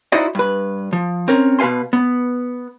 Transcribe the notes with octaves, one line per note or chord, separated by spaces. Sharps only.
D#4 E4 F#4 C5 D5 D#5
G2 B4
F3
C4 C#4 A#4
B2 B4 F5 G#5 C6
B3